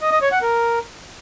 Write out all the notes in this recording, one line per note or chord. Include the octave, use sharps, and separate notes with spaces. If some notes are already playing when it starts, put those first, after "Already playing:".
D#5
D#5
C#5
F#5
A#4